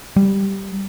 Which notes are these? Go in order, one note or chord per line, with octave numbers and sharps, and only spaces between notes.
G3